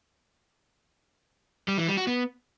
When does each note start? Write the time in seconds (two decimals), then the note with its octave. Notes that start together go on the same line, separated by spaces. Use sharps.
1.68 G3
1.78 E3
1.88 G3
1.97 F#4
2.07 B3